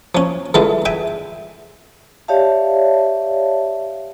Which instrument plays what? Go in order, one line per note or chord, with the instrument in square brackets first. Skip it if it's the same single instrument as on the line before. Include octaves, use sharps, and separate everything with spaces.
[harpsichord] F3 C#4
D3 E3 G#3 F4 A4
E5 G5 G#5
[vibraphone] G4 C#5 D5 E5 F5 A5